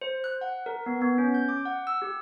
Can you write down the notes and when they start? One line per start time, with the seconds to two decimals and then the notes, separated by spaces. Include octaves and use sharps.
0.02 C5
0.24 F#6
0.41 F#5
0.66 A#4
0.86 B3
1.02 B3
1.18 C#4
1.34 G6
1.49 D6
1.65 F#5
1.87 E6
2.02 G4